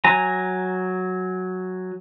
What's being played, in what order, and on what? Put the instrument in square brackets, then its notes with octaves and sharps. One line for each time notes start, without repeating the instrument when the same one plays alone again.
[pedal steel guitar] F#3 G#5 A#5